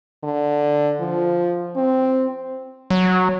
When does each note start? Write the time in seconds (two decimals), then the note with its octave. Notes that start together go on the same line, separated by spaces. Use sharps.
0.23 D3
1.00 F3
1.75 C4
2.90 F#3